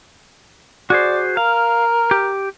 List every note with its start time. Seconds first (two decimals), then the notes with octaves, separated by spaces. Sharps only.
0.90 F#4 G#4 C5 D5
1.37 A#4 F5
2.11 G4